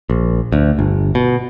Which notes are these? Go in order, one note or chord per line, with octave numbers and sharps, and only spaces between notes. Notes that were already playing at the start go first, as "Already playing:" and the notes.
A#1
D2
G1
B2